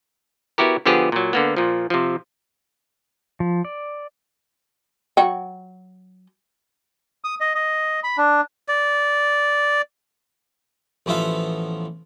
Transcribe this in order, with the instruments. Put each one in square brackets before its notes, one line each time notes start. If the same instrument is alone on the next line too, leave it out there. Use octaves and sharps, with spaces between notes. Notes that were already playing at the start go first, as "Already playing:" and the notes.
[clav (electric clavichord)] B3 E4 F#4 G4 A#4
D3 F3 B3 G4 G#4
A#2 F#3
D3 A#3 B3
A#2 F3
C3 F3
[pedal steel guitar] F3
D5
[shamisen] F#3 F#4 G5
[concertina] D#6
D#5
D#5
B5
D4
[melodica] D5
[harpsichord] A1 F3 B3 F4 E5 F5